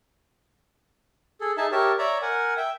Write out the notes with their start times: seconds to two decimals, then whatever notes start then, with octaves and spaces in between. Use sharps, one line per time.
1.41 G#4 A4
1.57 D#4 G#4 E5 A5
1.72 G4 A#4 C#5 E5 A5
1.99 C#5 D5 E5 A#5
2.22 A#4 F#5 G#5
2.57 E5 G5